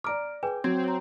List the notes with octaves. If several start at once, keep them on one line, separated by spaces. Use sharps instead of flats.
D5 A#5 D6 F6 D7
G#4 B4 G5 G#5
F#3 C4 G#6
C#5 A#5